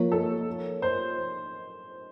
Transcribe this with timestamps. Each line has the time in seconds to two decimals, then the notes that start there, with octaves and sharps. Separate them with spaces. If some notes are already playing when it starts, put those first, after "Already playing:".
Already playing: F3 A#3 F4 A#4 C#5
0.12 A4
0.82 C5